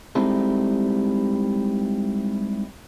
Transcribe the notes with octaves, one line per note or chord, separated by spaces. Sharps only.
G3 G#3 C4 D#4 E4 A4